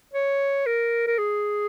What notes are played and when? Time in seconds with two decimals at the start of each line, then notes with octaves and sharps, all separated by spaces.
0.13 C#5
0.66 A#4
1.07 A#4
1.18 G#4